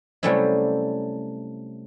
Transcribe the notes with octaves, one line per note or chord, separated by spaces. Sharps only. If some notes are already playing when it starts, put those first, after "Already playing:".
C3 F#3 G3 A3 C#4 E4